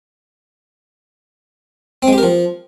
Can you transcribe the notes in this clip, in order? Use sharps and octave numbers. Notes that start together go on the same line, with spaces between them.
C4
G#3
G4
A#4
F3